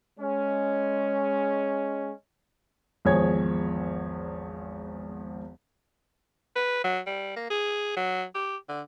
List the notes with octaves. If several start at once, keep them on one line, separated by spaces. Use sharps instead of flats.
G#3 C#4
G#1 E2 F3 G#4 C#5 G#6
B4
F#3
G3
A#3
G#4
F#3
G4
D3